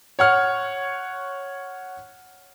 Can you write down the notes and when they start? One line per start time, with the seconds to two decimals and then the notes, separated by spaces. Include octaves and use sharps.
0.19 C#5 F#5 F6